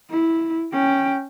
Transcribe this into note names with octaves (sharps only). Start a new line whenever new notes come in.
E4
C#4 G5